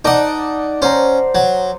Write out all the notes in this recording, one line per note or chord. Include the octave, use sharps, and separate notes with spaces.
D#4 D5 F#5 A5 D6
C#4 C5 F#5 A#5
F#3